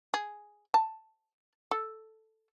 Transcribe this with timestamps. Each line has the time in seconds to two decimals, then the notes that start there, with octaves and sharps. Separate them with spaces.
0.14 G#4
0.74 A5
1.71 A4